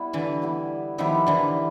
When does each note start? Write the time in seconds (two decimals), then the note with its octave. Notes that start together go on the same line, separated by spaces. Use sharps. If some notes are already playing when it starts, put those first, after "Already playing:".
Already playing: G3 B3 E4 G4
0.13 D3 E3
0.42 G3 B3 E4 G4
0.98 D#3 F3 G3 B3 E4 G4
1.27 D3 E3